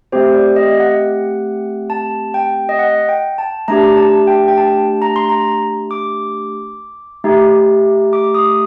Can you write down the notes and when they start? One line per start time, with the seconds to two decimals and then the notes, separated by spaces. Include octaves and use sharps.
0.12 A3 C4 G4 C5
0.34 D5
0.56 D#5
0.80 F#5
1.90 A5
2.34 G5
2.69 D#5
2.79 F#5
3.09 G5
3.38 A5
3.68 A3 D4 G4 A#5
3.97 A5
4.27 G5
4.48 G5
4.57 A5
5.02 A#5
5.16 C6
5.29 A#5
5.91 D6
7.24 A3 D#4 G4
8.13 D6
8.35 D#6